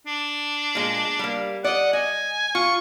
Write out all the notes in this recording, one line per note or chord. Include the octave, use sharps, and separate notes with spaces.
D4
A#2 G#3
G3 A#3
D5 D#5 F#5
D#5 G#5
F4 C#6